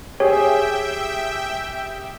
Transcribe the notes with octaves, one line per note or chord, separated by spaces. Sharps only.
G4 G#4 C#5 E5 G5